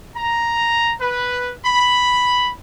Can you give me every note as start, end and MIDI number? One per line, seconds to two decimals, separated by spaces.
0.15 0.94 82
1.01 1.53 71
1.66 2.51 83